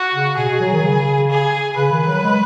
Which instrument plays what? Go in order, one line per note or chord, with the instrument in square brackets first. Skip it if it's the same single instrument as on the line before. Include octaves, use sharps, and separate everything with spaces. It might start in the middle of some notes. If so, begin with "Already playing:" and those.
Already playing: [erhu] F#4
[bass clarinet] C#3
[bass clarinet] B2 [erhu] G#4
[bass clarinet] B2
F#3
D#3
C#3
[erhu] G#4
[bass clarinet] C#3 [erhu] B4
[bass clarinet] D#3
F#3
G#3